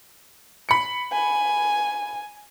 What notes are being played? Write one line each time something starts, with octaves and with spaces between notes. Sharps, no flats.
B5 C#7
G#5